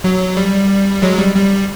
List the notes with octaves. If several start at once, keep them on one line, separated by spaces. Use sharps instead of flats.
F#3
G3
F#3 G#3
G3
G3